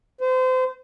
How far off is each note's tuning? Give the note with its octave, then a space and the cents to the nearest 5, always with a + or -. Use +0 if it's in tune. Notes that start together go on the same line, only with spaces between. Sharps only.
C5 -30